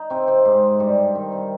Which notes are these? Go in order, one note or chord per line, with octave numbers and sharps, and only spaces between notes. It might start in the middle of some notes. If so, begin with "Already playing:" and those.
Already playing: D#4
C3 C4
C3 C4
G#2 G#3
G2 G3
D#3
C3